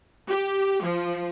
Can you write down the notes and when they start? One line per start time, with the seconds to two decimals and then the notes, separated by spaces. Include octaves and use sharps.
0.29 G4
0.83 F3